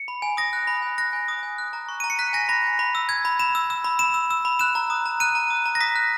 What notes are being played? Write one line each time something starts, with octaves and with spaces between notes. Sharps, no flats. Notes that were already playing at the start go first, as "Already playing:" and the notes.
Already playing: C#7
B5
G#5
D#6 A#6
F#6
B5
G#5
F#6 A#6
G#5
D#6
G#5
F#6
A#5
C#6
A#5 D#7
C#7
F#6 B6
G#5 A#6
B5 A#6
G#5
B5
E6
E6 G#6
B5
B5 E7
E6
E6
B5
B5 E7
E6
E6
B5
F#6 E7
A#5
D#6
A#5
F#6 D#7
A#5
D#6
A#5
A#6
D#6 B6
F#6